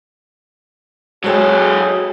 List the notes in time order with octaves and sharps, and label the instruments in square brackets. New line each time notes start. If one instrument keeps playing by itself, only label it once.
[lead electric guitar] F#3 A4 [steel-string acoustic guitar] G#3 C#5 G5 [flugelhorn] G#4